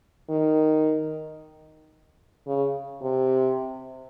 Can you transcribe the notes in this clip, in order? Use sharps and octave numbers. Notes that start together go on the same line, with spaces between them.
D#3
C#3
C3